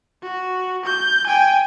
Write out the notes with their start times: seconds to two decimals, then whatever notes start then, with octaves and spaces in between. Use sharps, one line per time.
0.23 F#4
0.85 G6
1.27 G5 G#5